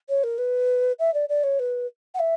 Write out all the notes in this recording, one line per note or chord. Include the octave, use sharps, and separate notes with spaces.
C#5
A#4
B4
E5
D5
D5
C#5
B4
F#5
E5